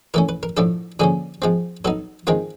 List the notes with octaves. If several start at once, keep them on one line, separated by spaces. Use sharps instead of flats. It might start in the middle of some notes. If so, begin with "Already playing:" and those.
E3 A3 C#4 A#4
B4
A#4
A2 F3 A3 D4 A4
D3 F3 A#3 C#4 G#4
F3 G#3 C4
F#3 B3 D#4 A4
D#3 G#3 C4 F4 A#4